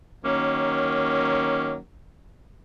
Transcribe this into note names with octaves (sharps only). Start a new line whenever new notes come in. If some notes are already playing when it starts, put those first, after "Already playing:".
D#3 F#3 A#3 C#4